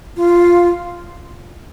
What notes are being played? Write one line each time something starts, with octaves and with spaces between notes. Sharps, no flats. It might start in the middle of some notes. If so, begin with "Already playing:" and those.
F4